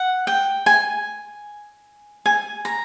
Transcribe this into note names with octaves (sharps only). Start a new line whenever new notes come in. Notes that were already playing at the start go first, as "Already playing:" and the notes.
Already playing: F#5
G5
G#5
G#5
A#5